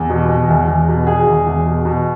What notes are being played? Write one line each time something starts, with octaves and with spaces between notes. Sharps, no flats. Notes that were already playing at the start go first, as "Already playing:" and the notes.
Already playing: E2
B2
B2
E2
E2
B2
B2 G#4
E2
E2
B2
B2